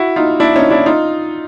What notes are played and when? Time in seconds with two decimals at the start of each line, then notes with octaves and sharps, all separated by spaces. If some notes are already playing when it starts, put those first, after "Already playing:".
Already playing: E4 F#4
0.16 D#4 F4
0.40 D4 E4
0.56 C#4 D#4
0.70 D4 E4
0.86 D#4 F4